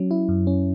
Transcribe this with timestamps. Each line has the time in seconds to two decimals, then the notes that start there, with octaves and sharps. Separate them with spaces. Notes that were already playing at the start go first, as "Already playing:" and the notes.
Already playing: F#3 C#4
0.11 E4
0.29 F#2
0.47 C#4